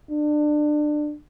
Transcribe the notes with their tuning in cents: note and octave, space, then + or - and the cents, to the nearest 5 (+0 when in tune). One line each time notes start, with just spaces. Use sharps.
D4 +25